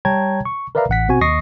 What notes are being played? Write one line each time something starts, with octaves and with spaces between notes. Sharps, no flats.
G3 C#5 G5 A5 A#5 G#6
C#6
A#4 B4 D5 E5 F5 A#5
A1 F#5 B6
B2 C4 F#4 G#5
D#2 D#5 C#6 D#6 A#6 C7